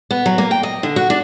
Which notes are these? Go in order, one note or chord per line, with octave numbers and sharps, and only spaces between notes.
B3
F#3
A#3
G5
D#5
D3
F#4
D4